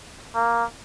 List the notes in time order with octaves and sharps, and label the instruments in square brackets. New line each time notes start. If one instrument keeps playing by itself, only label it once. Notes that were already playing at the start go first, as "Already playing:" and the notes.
[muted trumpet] A#3